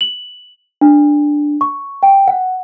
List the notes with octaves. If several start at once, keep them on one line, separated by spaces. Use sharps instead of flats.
F#7
D4
C#6
G5
F#5